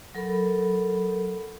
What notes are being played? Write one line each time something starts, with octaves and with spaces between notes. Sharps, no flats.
F#3 A4 A#4 B5